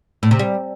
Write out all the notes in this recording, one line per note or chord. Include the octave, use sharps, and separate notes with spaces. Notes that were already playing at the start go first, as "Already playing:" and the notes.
A2
C3
G3